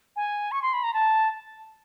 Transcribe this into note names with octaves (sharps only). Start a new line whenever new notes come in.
G#5
C#6
C6
B5
A#5
A5